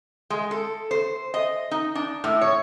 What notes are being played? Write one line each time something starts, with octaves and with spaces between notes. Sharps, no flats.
G#3
A4
C5
D#5
D#4
D4
A2
C#5